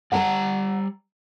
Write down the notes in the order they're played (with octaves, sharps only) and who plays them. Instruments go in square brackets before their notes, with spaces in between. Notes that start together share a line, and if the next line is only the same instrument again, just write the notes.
[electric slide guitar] G3 D5 A#5 [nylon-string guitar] F#5 A5